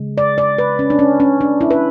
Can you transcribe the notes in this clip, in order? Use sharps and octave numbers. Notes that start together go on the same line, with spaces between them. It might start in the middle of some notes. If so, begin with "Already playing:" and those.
Already playing: C#3 G#3
D5
D5
B4
C#4
D4
C#4
C#4
D4
E4
B4